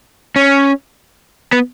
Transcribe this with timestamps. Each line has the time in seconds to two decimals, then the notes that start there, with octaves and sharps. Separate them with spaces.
0.36 C#4
1.53 B3